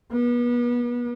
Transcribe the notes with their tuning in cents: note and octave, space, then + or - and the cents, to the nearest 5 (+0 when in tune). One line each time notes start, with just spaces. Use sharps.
B3 -35